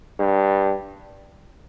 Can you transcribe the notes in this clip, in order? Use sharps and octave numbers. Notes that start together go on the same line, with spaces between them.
G2